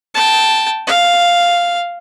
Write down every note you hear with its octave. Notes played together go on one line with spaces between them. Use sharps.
G5 A5
F5